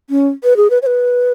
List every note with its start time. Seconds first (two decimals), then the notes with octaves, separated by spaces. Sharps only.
0.10 C#4
0.44 B4
0.57 G#4
0.70 B4
0.82 C#5
0.86 B4